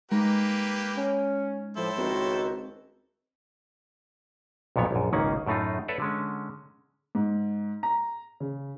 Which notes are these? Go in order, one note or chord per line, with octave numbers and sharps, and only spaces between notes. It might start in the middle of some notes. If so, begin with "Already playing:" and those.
G#3 A#3 D#4 G4 B4
C#4
A2 F3 E4 A4 C5
C#2 D#3 C4 F#4
B1 F2 A#2 B3 C#5
A#1 F#2
G#1 C#2 D#3 A#3 C#4 F#5
F#2 A2 A3 D#4 F4
A4 B4 C#5 D5 E5 F#5
D3 G#3 C#4
G#2
A#5
C#3